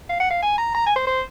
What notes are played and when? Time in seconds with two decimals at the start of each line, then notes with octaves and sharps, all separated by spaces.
0.09 F5
0.20 F#5
0.30 F5
0.42 G#5
0.58 A#5
0.74 A#5
0.86 G#5
0.96 C5
1.07 C5